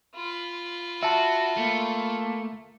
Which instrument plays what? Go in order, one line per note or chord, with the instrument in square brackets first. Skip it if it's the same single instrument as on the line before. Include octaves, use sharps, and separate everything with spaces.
[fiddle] F4 B5
[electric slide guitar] F#4 [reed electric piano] E5 A5
[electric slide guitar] A3 [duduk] A#3